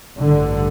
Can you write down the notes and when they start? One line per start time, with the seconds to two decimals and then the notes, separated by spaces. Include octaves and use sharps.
0.17 A1 G2 D3